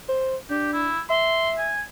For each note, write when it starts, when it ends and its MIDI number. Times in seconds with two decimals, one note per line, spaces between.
0.09 0.36 72
0.50 0.90 62
0.50 0.71 67
0.73 1.00 64
1.10 1.71 76
1.10 1.51 84
1.58 1.82 80